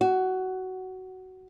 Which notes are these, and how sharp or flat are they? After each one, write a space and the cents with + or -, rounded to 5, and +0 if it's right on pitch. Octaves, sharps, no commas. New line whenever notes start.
F#4 +15